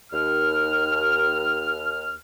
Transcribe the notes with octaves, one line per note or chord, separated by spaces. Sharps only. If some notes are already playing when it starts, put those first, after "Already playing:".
D#2 F6